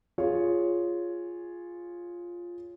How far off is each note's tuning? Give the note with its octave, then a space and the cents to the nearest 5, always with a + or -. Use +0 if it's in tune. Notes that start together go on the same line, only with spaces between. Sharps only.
F4 +0 G#4 +0 C#5 +0